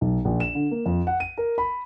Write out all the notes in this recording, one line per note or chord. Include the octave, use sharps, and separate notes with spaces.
B1
A#1
E7
D3
A#3
F2
F#5
D#7
A#4
B5